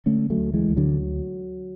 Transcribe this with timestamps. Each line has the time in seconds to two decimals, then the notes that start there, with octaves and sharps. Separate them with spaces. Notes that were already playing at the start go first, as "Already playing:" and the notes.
0.06 D3 A3 C#4
0.30 F#3 A3
0.37 D2
0.54 E3 G#3
0.68 D2
0.77 D3 F#3